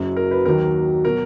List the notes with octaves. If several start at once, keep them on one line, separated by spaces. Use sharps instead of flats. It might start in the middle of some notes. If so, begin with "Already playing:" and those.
Already playing: F#1 F#2 C#3 F#3
A#4
B4
D#2 D#3 F#3 A#4
B2 F#3 A#4